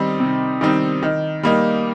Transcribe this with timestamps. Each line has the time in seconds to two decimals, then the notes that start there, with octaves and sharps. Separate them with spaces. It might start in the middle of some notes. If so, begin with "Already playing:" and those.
Already playing: D#3 G3 C4 D#4
0.20 C3
0.61 D#3 G3 C4 D#4
1.03 D#3
1.43 G3 A#3 D#4